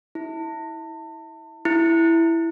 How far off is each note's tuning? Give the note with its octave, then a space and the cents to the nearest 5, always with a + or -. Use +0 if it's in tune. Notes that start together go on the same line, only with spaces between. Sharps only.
E4 -20
E4 +5